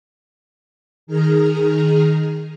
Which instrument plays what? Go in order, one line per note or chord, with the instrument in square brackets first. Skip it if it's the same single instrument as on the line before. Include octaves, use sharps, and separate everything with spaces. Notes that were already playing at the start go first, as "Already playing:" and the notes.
[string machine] D#3 G#4 A#5 F6